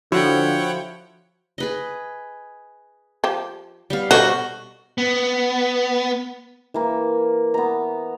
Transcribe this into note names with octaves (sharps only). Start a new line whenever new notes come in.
D3 F3 E4 F#4 C#5 F#5 G5
G#4 B4 D#5
F3 G4
G3 B3 F5
B2 F#4 A4 C5 D5 D#5 C6
B3
E3 A#3
B3 A#5